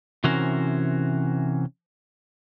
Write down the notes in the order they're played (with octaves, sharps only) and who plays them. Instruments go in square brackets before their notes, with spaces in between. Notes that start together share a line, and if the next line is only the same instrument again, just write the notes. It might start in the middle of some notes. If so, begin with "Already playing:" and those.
[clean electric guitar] C3 E3 C#4 F#4 A#4 C5